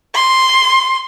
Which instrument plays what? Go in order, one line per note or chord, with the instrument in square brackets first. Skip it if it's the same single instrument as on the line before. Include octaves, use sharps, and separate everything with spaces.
[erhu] C6